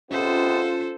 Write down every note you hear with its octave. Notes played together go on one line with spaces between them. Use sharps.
C3 G#3 B3 C#4 F4 A4 C5